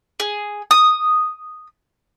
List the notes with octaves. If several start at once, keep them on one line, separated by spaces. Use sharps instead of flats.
G#4
D#6